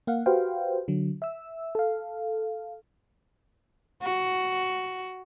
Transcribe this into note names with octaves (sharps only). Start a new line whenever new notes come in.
A#3 F5 F#5
F#4 G4 B4 C5 F5 G5
D3 F#3
E5 E6
A4 F5
F#4